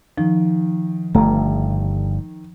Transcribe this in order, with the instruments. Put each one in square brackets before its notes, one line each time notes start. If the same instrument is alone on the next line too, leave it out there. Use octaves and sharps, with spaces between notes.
[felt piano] D#3 [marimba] F3
[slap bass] G1 G2 [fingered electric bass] A3 [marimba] A#5